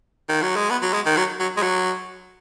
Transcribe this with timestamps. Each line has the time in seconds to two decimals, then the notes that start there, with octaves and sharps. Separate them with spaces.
0.29 D#3
0.42 F#3
0.56 G#3
0.70 B3
0.82 F#3
0.93 G#3
1.06 D#3
1.17 F#3
1.40 F#3
1.57 G#3
1.62 F#3